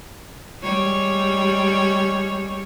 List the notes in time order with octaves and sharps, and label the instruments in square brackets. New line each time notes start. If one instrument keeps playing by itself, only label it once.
[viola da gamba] G3 G#3 C#5